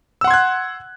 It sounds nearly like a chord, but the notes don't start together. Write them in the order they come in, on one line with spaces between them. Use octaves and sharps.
E6 F#5 C6 G#6 F#6